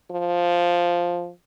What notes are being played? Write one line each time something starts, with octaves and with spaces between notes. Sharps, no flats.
F3